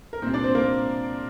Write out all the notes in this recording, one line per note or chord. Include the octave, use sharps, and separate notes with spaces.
A#4
C2 A#2 C4 C5
D4 D5
C4 C5
A#3 A#4